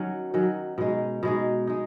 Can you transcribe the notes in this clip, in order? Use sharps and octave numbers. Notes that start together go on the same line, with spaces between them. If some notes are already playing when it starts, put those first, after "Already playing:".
Already playing: D#3 F#3 C#4
D#3 F#3 C#4
B2 G#3 D#4
B2 G#3 D#4
G#3 D#4